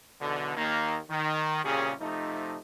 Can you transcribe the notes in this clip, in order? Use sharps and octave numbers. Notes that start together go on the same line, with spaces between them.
B1 E2 B2 D3
D#2 D#3 A#3
D#3
C2 A#2 C#3 C#4 G4 G#4
C3 F3 A3 D#4